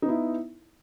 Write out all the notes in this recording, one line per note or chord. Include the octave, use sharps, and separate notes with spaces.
B3 D#4 E4